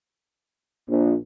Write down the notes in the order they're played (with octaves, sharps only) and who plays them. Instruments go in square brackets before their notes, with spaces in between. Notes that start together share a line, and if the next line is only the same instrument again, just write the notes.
[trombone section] A#1